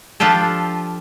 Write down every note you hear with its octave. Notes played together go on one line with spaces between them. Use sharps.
F3 D4 F4 G4 A4